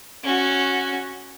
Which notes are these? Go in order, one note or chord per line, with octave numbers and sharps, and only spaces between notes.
C#4 F#4